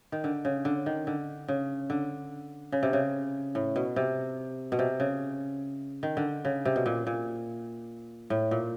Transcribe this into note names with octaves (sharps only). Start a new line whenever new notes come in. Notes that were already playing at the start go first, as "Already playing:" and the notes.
D#3
D3
C#3
D3
D#3
D3
C#3
D3
C#3
C3
C#3
A2
B2
C3
B2
C3
C#3
D#3
D3
C#3
C3
B2
A#2
A#2
A2
A#2